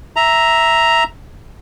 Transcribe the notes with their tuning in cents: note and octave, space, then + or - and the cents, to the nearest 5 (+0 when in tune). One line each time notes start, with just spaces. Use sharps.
E5 +0 A#5 +5